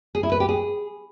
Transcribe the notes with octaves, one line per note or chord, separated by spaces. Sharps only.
G#4
E4
B4
G4
G#4